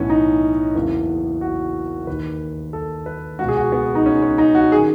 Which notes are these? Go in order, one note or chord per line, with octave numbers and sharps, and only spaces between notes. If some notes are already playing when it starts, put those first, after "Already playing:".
Already playing: B1 A2 E3 B3 C#4
D#4
F#1 E2 C#3 E3
F#4
D#2 D#3 B4
A4
B4
C#2 B2 F#4
G#4
F#4
B3
D#4
C#4
C#4
D#4
F#4
G#4
D#3